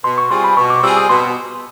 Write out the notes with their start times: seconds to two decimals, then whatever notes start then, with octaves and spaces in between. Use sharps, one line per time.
0.04 B2 C6
0.18 C#6
0.30 G3 C4 F4 G#4 C6
0.44 B5
0.57 B2 C#6
0.70 D6
0.83 G3 C4 F4 G#4 E6
0.97 D#6
1.09 B2 C6